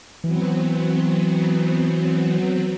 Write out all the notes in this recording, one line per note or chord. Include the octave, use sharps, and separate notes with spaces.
E3 F#3 B3 C4